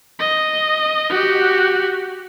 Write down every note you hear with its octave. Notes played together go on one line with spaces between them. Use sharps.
D#5
F#4 G4